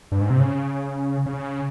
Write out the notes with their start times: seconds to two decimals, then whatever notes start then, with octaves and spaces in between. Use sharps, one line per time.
0.12 G2
0.21 G#2
0.30 C3
0.40 C#3
1.26 C#3